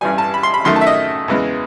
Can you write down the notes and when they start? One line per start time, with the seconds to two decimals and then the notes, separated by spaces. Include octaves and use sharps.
0.01 A1 G2 E3 G3 G#5
0.18 A5
0.34 B5
0.43 C6
0.54 B5
0.64 F#2 D#3 F#3 A3 C6
0.76 A5
0.81 E5
0.87 D#5
1.28 E2 C#3 E3 G#3